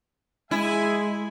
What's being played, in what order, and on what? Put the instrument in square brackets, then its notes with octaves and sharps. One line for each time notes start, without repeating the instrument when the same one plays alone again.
[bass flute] G#3 [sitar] E4 [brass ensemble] G#4 E5 G#5